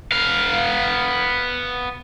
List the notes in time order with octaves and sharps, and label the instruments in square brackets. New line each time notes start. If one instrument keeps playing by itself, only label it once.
[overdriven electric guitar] B3 F5